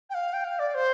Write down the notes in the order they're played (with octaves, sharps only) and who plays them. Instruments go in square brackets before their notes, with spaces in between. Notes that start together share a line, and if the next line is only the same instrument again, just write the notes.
[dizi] G5
F5
G5
F5
D5
C5